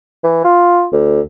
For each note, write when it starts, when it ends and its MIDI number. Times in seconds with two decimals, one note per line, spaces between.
0.24 0.41 52
0.44 0.86 65
0.92 1.20 38